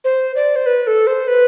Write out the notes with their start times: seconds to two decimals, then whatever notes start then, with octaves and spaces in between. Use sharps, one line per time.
0.04 C5
0.36 D5
0.56 C5
0.66 B4
0.87 A4
1.07 C5
1.28 B4